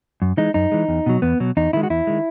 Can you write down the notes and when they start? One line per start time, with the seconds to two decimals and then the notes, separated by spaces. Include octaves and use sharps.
0.22 F#2
0.37 E3 G#3 D#4
0.54 F#2 D#4
0.72 E3 G#3
0.89 E2
1.06 B2 F#3
1.22 E2 B3
1.40 B2 F#3
1.57 E2 D#4
1.73 D#3 G#3 E4
1.83 F#4
1.90 E2 E4
2.07 D#3 G#3